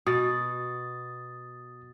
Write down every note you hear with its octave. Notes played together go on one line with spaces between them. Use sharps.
B2 D#6 A6